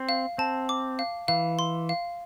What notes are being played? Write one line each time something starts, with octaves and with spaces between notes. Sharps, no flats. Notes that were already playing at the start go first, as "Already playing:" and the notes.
Already playing: C4
F5
C4 A5
D6
F5
E3 F5
C6
F5